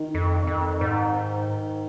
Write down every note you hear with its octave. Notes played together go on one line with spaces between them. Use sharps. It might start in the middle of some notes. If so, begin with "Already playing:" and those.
Already playing: D#3
F2
F2
G#2